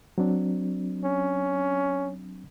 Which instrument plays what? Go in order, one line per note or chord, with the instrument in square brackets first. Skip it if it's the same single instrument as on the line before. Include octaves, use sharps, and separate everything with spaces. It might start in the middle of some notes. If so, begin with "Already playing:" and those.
[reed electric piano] F#3 C4 D4
[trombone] C#4